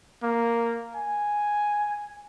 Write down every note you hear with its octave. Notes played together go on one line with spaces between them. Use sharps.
A#3
G#5